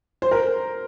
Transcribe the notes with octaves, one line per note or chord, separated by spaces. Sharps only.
C5
A#4